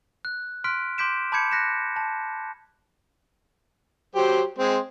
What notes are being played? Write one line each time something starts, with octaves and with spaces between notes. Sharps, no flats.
F#6
C6 F6 F#6 B6 D7
C6 D6 G6 B6 D7 E7
A5 B5 D6 G6 G#6 C#7
F#6 A#6 B6 C#7 E7
A5
F#3 G4 C5
G#3 C4